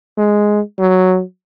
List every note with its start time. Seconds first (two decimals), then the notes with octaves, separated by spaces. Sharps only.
0.18 G#3
0.79 F#3